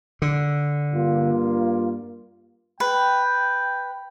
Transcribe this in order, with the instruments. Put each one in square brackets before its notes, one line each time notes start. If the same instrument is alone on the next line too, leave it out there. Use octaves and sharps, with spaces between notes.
[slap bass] D3
[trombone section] G2 A#3 F4
[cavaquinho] B4 [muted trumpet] G5